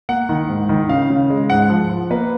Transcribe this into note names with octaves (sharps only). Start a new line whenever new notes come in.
A#3 F#5
D#3
G#2
D#3
C#3 F5
C#3
G#3
G#2 F#5
F3
F3
A#3 B4